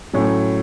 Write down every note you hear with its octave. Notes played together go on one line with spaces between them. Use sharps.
A2 F#3 A3 C#4